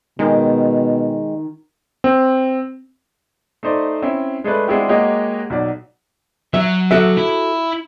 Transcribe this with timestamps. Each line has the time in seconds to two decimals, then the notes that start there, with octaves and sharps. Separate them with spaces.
0.19 B2 D#3 G#3 D#4 G4
2.04 C4
3.63 A3 D#4 C5 D5
4.02 C4 C#4 E4
4.44 G#3 A3 D4 B4
4.68 G#3 C4 D4 E4 F#4 G4
4.89 G#3 A#3 F#4 G4 C#5 D#5
5.50 B1 F#3 D5
6.54 F#3 E5
6.91 F#4 A4 E5
7.17 E4